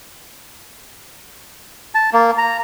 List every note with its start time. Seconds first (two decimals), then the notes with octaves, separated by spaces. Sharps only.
1.95 A5
2.13 A#3
2.38 A#5